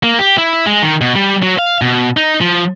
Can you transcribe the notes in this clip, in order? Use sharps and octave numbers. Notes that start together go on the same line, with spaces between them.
A#3
G4
E4
G#3
D#3
B2
G3
F#3
F5
B2
D#4
F3